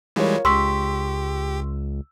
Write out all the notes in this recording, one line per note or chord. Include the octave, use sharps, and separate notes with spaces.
E3 G3 G#3 F4 A#4 C#5
C#2 G4 C6 C#6 E6 B6